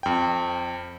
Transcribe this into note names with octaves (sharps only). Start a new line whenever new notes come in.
F2 G5